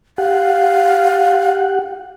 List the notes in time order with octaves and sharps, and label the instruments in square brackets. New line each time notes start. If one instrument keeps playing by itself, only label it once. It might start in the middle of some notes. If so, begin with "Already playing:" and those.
[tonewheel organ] G4 F#5 [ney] F5